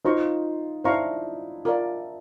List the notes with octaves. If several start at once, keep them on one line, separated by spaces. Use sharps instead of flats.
D#4 F4 C5 F5 A#5 C#6
D4 E4 C5 F5 A#5 C#6
F4 A#4 D5